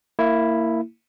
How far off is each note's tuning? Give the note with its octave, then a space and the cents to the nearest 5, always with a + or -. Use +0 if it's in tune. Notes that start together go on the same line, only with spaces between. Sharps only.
A#3 -20 E4 +0